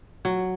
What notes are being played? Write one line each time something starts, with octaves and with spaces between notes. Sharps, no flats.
F#3